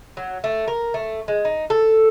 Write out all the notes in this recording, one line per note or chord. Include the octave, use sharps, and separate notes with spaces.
F#3
A3
A#4
A3
G#3
D#4
A4